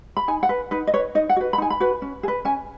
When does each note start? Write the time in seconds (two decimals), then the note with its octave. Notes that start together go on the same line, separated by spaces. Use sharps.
0.17 B5
0.28 D#4 G#5
0.43 F#5
0.49 B4
0.71 D#4 B4
0.87 D#5
0.94 B4 C#5
1.15 D#4 D#5
1.30 F#5
1.36 F#4 B4
1.53 B5
1.58 D#4 G#5
1.70 B5
1.80 F#4 B4
2.02 C#4
2.23 G#4
2.28 B4
2.45 C#4 G#5